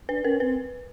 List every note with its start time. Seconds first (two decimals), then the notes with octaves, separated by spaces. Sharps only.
0.09 D4 B4
0.24 C#4 A#4
0.40 C4 B4